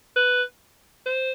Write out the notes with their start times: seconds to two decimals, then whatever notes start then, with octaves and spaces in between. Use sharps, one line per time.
0.16 B4
1.06 C5